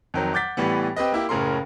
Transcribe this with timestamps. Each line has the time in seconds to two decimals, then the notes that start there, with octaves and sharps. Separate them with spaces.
0.14 F2 D#3 F#3
0.33 F#5 D6 G6 A6 B6
0.57 A2 E3 G3 B3
0.96 C4 G4 B4 D#5
1.12 A#3 E4 G4
1.29 F#1 A2 C#3 A#4 C6